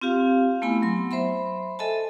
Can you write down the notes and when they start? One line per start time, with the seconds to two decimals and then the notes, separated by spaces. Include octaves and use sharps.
0.01 C4 F4 G4 F5
0.62 A3 B3 E4 G#5 B5
0.82 F#3 C6
1.11 C5 E5 B5 C6
1.79 A4 D#5 E5 G#5 A5